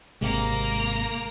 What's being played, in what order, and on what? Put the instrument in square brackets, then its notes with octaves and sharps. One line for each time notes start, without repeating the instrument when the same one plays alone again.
[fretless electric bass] G#1 C3 G#3 [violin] A#3 A#5